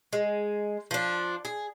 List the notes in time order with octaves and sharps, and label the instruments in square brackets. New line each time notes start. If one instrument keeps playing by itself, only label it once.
[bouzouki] G#3
F3 D4
G#4